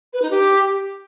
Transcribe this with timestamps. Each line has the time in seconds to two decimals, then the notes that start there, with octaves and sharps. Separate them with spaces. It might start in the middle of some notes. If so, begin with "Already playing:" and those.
0.13 B4
0.22 D#4
0.30 G4